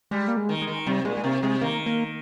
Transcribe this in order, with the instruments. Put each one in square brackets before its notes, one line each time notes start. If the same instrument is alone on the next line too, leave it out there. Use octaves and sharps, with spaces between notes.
[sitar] G3 [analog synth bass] G#3
[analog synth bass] A#3
G#3
[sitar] D#3
[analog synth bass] G#3
[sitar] D#3
[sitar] C3 [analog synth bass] G3
[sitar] A#2 [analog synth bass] G#3
[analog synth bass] G#3
[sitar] C3 [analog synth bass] A#3
[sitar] C3 [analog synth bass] G#3
[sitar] D#3 [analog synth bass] A#3
[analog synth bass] A#3